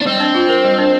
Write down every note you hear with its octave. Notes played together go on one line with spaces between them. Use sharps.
D4
G3 C4
D4
F4
A#4
G3
D4